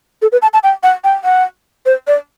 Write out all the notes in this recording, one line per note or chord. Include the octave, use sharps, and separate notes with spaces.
A4
B4
A5
A5
G5
F#5
G5
F#5
C5
D5